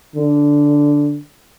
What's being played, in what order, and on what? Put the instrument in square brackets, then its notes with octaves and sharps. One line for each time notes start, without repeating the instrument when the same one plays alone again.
[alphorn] D3